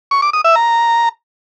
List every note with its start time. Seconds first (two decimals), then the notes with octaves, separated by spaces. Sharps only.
0.11 C#6
0.22 D6
0.33 D#6
0.44 E5
0.56 A#5